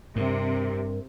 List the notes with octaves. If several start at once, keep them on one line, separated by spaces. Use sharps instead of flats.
G2 C3 A#4